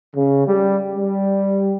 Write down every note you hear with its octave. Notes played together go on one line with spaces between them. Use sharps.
C#3
G3
G3